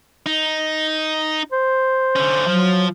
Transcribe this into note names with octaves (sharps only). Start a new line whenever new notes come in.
D#4
C5
D3 C#4
F3 F#3